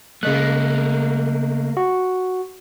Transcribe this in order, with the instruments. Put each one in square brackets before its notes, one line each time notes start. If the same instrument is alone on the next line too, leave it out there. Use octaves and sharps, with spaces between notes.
[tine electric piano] C#3 D#5 F#6 [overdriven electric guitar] A3 A#3
[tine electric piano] F#4